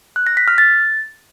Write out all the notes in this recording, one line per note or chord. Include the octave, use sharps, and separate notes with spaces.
F#6
A#6
B6
F6
A6